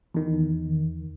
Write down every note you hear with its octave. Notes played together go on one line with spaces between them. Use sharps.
E2 D#3